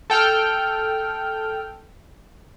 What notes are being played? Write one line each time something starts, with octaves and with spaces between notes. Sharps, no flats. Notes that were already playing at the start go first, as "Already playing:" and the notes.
A4 G5 F6